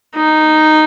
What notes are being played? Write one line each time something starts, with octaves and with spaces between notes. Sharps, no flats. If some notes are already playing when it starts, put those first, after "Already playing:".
D#4